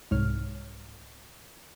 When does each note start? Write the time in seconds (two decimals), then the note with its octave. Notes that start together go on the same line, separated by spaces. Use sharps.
0.11 C2 G#2 C#5 F6